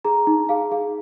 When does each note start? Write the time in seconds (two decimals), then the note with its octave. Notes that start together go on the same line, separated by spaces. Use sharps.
0.05 G#4 A#5
0.27 D#4
0.49 G#4 F5
0.72 G#4 F5